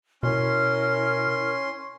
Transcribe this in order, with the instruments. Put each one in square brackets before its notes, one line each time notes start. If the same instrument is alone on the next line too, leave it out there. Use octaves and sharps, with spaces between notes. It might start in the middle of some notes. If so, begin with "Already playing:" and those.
[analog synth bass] B2 [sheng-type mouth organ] C#4 C6 [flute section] E4 A#4 F6